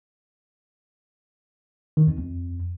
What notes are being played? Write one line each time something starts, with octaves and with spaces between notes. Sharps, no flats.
D#3
F2
F2